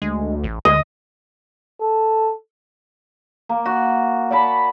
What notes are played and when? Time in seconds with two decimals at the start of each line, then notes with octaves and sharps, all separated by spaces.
0.02 D2 G#3
0.44 A1
0.65 D2 G#3 D#5
1.81 A4
3.49 A#3
3.66 F#4
4.30 D5 F#5 A5 B5